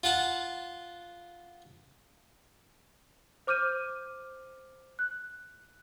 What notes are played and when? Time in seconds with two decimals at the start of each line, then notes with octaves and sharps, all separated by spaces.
0.03 F4 F#5 A5
3.47 C5 D6 F6 G6 D#7
4.99 F#6